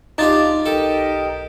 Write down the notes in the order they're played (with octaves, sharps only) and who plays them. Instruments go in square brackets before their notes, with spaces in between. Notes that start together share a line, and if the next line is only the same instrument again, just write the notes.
[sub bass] C#2 [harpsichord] D4 F4 G4 [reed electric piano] D#4 A6
[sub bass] B1 [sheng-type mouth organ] G4 A#4 D#5 [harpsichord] A4